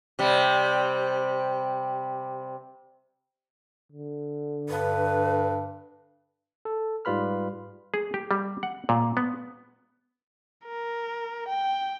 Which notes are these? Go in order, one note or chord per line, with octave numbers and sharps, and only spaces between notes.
C3 G3
D3
G2 B4
A4
G#2 G3 F4 B4 B5 F6
G#4
G4
G3
F#5
A#2
B3
A#4
G5